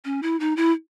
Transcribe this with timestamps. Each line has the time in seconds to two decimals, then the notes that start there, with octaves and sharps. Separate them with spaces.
0.05 C#4
0.23 E4
0.40 D#4
0.57 E4